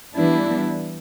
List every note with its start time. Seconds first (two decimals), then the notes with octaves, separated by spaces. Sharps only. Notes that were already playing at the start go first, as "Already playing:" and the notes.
0.16 E3 G3 B3 D4 E4